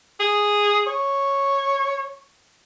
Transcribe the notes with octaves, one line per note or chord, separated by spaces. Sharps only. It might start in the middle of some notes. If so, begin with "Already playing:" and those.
G#4
C#5